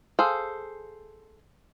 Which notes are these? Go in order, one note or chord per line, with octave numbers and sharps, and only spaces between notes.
G#4 A4 C5 F5